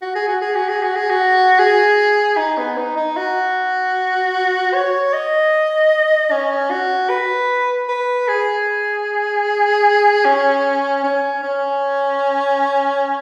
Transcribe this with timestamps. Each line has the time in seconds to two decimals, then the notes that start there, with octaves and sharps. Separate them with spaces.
0.02 F#4
0.15 G#4
0.28 F#4
0.42 G#4
0.56 F#4
0.69 G#4
0.83 F#4
0.96 G#4
1.10 F#4
1.59 G#4
2.37 D#4
2.58 B3
2.77 D#4
2.97 D#4
3.17 F#4
4.74 C#5
5.13 D#5
6.31 C#4
6.71 F#4
7.10 B4
7.89 B4
8.28 G#4
10.25 C#4
11.04 C#4
11.43 C#4